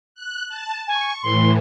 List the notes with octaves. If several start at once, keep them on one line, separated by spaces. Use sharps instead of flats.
F#6
A5
G#5 C#6
A2 E3 C6